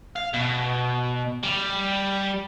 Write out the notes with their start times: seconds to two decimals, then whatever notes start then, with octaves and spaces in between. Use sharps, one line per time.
0.16 F5
0.34 B2
1.44 G3